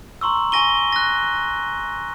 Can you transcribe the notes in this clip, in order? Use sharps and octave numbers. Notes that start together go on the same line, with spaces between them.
A#5 C6 C#6 E6
G#5 C#6 A#6 D#7 G7
F#6 A#6